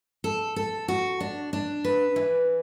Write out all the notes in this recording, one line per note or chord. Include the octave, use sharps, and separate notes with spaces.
A4
A4
F#4
D4
D4
B4
E3